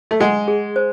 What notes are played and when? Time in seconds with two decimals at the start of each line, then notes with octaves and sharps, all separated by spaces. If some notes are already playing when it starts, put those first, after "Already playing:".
0.11 A3
0.20 G#3 F#5
0.48 G#4
0.76 C5